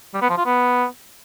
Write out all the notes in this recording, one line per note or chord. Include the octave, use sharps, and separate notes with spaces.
G3
B3
F3
F4
B3